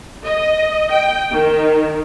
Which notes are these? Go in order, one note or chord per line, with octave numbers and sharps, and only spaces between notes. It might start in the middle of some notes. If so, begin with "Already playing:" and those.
D#5
G5
D#3